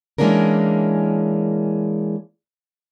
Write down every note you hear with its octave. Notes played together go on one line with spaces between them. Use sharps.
E3 G#3 A#3 C#4 D4 A#4